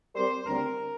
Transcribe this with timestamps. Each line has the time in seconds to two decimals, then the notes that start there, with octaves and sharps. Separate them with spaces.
0.14 G3 C4 G4 A#4 C5 D5
0.46 D2 D3 G3 C4 A#4